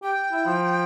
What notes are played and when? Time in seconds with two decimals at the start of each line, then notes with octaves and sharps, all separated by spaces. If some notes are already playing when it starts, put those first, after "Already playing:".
0.02 G4 G5
0.32 E4
0.45 F3